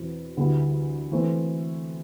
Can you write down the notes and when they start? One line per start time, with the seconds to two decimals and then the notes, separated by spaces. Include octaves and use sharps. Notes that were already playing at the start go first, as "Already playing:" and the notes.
Already playing: E2 B2 F#3 C4 E4
0.37 D2 D3 G3 B3 E4
1.12 E3 A3 C4